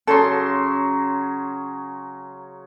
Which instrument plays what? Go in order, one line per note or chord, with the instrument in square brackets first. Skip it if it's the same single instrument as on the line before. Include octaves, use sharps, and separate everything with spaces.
[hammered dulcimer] C#3 F#3 C6 [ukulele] A4